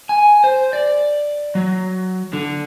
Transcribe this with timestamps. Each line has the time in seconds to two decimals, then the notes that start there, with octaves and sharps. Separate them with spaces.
0.09 G#5
0.44 C5
0.73 D5
1.55 F#3
2.33 D3